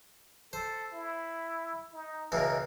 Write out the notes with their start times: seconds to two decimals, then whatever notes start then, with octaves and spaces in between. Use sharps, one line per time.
0.53 A4 C5
0.92 E4
1.93 D#4
2.32 C#2 B2 E3 A#4